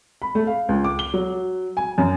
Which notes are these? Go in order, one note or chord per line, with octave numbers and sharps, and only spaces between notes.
B5
A3
F5
C#2
D6
G7
F#3
G#5
F#2